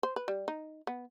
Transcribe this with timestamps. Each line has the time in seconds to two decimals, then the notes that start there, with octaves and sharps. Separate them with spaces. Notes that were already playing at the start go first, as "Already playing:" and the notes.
0.03 C5
0.16 B4
0.28 G3
0.48 D#4
0.87 B3